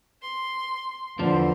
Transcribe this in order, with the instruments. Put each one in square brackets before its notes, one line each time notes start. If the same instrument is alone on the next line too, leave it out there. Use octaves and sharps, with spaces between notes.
[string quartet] C6
[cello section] E2 C5 [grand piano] D3 D5 A5 [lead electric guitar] F3